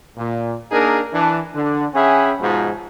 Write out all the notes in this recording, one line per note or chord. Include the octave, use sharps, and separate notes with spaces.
A#2
A#3 D4 D#4 G#4 A#4
E3 D4 A5
D3 D4
C#4 G#4 E5 F#5 G5 B5
G#2 B2 F3